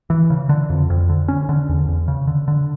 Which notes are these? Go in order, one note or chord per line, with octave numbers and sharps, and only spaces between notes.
E3
C#3
D3
F2
F2
D3
C#4
D3
E2
E2
C#3
D3
D3